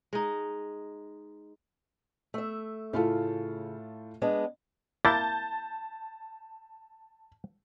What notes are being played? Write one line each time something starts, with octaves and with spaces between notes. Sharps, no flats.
G#3 D#4
A3 E5
A2 C#3 F4 A4
G#3 B3 D4
A#3 E4 A5 G6 A6